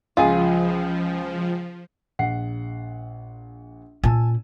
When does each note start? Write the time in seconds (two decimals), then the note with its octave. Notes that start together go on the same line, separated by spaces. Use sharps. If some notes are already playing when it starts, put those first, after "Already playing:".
0.17 C#2 F3 F4 G#4 G#5
2.19 A#1 F#5 C7
4.04 A#2 C#4 G#5 A5 E6